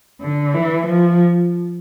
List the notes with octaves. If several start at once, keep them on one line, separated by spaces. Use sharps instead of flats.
D3
E3
F3